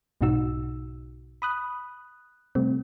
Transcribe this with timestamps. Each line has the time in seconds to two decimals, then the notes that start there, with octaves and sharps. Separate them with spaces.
0.21 B1 G#2 B2 D#4 F#4 E6
1.42 B5 D#6 F#6
2.55 C3 G3 A3 C4